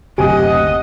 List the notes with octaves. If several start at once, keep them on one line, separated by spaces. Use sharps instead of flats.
F#1 D2 C3 G4 D#5 F#5 G#5